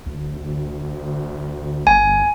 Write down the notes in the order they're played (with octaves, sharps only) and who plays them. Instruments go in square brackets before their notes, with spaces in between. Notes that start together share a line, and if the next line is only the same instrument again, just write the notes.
[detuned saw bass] D2
[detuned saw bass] G1 [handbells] G#5